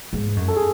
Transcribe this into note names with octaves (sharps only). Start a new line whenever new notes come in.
G#2
F#2
A4
G#4